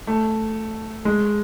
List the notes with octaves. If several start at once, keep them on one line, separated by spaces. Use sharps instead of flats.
A3
G#3